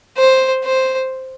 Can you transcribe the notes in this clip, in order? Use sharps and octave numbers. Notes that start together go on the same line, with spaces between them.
C5
C5